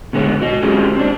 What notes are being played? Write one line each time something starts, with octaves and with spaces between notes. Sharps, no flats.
B2 D3 G#3 B3 C#5
F#4 D#5
G#3 C4 C#4 F4 G4 G#4
C4 D4